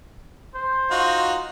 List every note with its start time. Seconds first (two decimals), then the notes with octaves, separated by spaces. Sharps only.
0.55 C5
0.91 D#4 F4 F#4